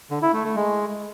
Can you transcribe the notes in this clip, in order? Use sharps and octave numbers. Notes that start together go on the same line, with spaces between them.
D3
E4
A3
A3
G#3